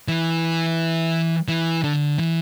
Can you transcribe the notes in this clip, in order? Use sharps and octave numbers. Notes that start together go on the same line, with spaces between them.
E3
E3
D3
E3